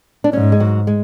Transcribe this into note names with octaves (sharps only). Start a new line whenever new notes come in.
D4
G#2 C#4
G#3
F#3
G#3